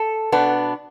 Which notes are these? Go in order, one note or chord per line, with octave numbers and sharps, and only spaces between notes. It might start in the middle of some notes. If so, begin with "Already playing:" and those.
Already playing: A4
B2 B3 D4